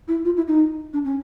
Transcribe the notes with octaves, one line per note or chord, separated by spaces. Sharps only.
E4
F4
E4
D#4
D4
C#4